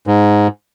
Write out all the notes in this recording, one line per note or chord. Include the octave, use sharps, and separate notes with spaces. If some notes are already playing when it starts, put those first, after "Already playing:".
G#2